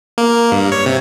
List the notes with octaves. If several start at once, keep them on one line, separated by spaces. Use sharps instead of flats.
A#3
G2
C#5
C3